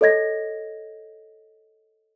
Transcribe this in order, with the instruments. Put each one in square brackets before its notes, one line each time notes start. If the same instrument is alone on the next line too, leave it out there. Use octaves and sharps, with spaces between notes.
[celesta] A4 C#5 D#5 G#6 A#6